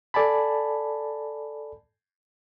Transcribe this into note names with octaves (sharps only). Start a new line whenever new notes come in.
A4 D5 G#5 A5 B5